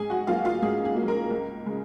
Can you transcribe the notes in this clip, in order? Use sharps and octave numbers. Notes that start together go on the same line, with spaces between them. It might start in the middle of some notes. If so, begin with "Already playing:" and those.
Already playing: G#2 G#4 G#5
F#4 F#5
F#3 A#3 F4 F5
F4 F5
G#2 G#4
G#4
A#3
F#3
A#4
C#2
C#3 G#3